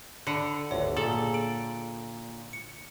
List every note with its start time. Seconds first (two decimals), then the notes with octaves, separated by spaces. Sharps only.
0.27 D3 F#5 B5
0.71 G1 D2 C#5
0.97 A#2 G#4 A4
1.34 D7 F#7
2.53 C#7